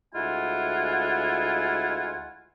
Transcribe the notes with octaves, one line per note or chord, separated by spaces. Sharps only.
D2 G#3 E4 F4 F#5 G#5